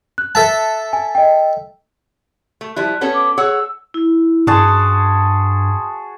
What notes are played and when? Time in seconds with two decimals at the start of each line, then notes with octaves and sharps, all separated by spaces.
0.18 F#6
0.35 A4 E5 A5
0.93 G#5
1.15 D#5 G5
2.61 A3
2.76 F3 G3 E4 F#6
3.01 B3 C#4 A4
3.15 D6
3.38 G#4 C#5 F#5 E6
3.94 E4
4.47 G2 F#4 G#4 A5 C6 D#6